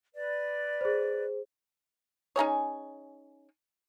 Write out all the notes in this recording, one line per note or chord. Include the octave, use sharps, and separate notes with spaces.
B4 D5
G#4 C5
C#4 D#4 G#4 C#5